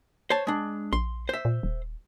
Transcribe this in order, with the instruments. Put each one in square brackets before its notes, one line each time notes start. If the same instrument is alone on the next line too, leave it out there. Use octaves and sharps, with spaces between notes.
[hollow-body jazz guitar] C5 C#5 A5
G#3 D4
[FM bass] A#1 [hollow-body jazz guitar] C6
[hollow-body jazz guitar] C5 E5
[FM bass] A#2
D#1